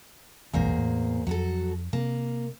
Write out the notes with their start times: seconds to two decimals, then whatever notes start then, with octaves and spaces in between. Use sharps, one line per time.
0.53 F1 B1 E2 G#2 A#3 C5
0.78 A2
1.27 F2 F#3 F#4 A4
1.93 C3 A#3